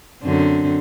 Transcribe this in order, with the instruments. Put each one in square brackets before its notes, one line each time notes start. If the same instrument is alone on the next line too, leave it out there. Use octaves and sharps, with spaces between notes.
[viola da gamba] F#2 D3 C4